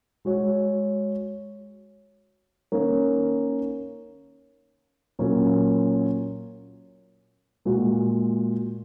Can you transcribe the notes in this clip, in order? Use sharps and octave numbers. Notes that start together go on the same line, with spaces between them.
G#3 F#4 C#5
D#3 A#3 C#4 A#4 C#5
A#2 F#3 C#4 A#4 C#5
A#2 G#3 F#4